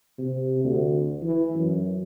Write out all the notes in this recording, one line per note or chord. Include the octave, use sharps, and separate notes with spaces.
C3
D2
E3
F#2